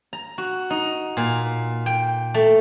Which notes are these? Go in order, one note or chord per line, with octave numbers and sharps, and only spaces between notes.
A#5
F#4
D#4
A#2
G5
A3